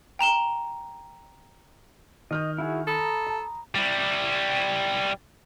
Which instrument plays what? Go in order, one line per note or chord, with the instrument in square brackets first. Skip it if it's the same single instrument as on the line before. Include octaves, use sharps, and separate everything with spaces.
[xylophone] G5 A#5 E7 G7
[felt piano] D#3 F6 G6 [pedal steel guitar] D#5
[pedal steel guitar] E4 F#4 G#4
[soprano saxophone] A4 [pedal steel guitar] A#5 B5 D#6
[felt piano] A5
[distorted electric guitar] G3 E4